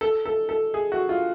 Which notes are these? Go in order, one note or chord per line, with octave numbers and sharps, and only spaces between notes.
A4
A4
A4
G#4
F#4
F4